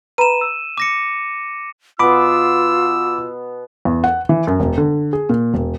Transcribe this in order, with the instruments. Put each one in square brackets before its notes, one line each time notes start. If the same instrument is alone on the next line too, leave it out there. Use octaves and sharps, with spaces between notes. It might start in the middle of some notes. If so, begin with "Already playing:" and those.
[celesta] B4 A#5 B5 [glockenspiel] D#7 E7
[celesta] E6
[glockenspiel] D6 A#6 C#7
[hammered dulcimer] B2 B3 [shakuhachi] F4 [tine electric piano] B5 D6 [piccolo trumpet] E6
[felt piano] E2
F#5
E3
F#2
E1
D3
G#4
A#2
E1